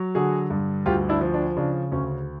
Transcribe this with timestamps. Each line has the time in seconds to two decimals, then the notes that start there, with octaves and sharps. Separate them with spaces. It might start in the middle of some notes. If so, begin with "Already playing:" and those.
Already playing: F#3
0.15 D3 F#4 G#4
0.50 G2
0.86 D2 F4 G4
1.09 D4 E4
1.21 F3
1.34 D4
1.57 C#3 D4
1.92 D2 C#4